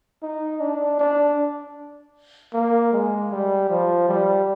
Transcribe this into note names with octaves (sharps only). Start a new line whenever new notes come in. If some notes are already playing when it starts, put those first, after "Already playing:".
D#4
D4
D4
A#3
G#3
G3
F3
G3